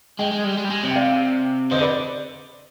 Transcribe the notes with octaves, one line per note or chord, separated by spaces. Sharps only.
G#3 D#5 G5
G#3
G3
G#3
G3
G#3
C3
G5
D5 F5
D3 C5 D#5
B4 D5